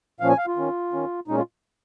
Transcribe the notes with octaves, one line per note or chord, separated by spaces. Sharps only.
A#2 F3 C#4 F5
G#5
F5
F4
D#3 C#4
D#3 C#4
A#2 G#3 C#4 D#4
F4